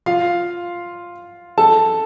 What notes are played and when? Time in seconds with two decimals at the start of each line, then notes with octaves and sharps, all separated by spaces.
0.06 F4 F5
1.58 A4 A5